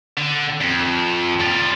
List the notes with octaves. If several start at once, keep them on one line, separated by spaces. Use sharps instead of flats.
D3
F2
G3 F4